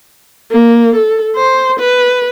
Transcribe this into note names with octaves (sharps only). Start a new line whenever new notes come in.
A#3
A4
C5
B4